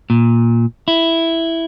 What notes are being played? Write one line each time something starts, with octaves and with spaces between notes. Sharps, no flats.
A#2
E4